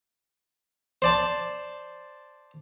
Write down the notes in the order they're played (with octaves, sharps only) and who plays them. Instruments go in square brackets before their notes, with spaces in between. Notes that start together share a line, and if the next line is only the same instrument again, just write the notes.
[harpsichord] C5 D5 A5